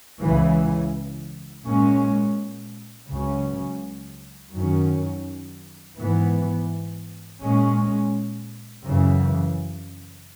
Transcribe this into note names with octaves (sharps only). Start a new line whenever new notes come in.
C#2 C#3 E3
A#2 G#3 C#4
C#2 C#3 F#3 C#4
F#2 D#3 F#3 C#4
G#2 E3 B3
A#2 G#3 C#4
F#2 C#3 E3